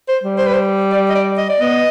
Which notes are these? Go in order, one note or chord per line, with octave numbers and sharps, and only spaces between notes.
C5
G3
C5
B4
C5
D5
D#5
D5
D#5
D5
B3 D#5